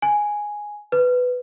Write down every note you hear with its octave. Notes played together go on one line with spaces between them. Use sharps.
G#5
B4